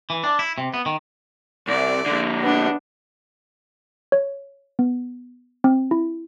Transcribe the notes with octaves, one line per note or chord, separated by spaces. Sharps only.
E3
D4
E4
C3
B3
D#3
C2 D5
F2 D3
B3 D4
C#5
B3
C4
E4